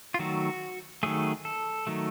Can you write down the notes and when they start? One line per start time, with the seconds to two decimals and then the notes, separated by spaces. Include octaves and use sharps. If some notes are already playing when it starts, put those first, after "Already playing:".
0.14 F4
0.19 D#3 F#3 A3 F#4
1.03 D#3 F#3 A3 G#4
1.45 A4
1.87 D#3 F#3 A3